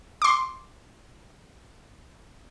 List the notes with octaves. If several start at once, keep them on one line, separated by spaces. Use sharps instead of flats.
C6 D6